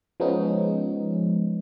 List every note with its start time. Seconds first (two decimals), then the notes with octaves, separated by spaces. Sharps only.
0.20 F3 G#3 B3 C#4 D#4